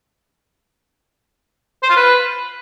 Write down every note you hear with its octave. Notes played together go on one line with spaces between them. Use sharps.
C5
F4
B4